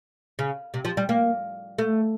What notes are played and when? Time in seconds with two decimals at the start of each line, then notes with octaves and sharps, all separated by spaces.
0.39 C#3
0.74 C3
0.85 F3
0.97 G3
1.09 A#3
1.78 A3